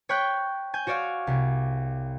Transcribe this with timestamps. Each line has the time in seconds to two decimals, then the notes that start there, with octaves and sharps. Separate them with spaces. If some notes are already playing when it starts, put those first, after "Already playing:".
0.09 C#5 G5 B5 F#6 G6
0.74 G#5 G6
0.87 F#4 C#5 D5 F5
1.27 C2